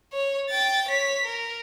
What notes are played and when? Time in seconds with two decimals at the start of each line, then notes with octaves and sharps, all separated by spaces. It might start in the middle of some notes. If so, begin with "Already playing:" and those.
0.13 C#5
0.50 G5 A6
0.88 C#5 B6
1.25 A#4